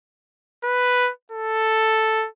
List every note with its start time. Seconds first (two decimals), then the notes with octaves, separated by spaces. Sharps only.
0.64 B4
1.32 A4